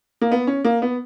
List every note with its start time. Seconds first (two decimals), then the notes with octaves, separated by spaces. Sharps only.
0.21 A#3
0.31 B3
0.47 C#4
0.64 A#3
0.82 B3